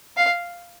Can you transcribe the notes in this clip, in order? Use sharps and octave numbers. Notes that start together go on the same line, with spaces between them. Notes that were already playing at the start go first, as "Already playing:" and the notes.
F5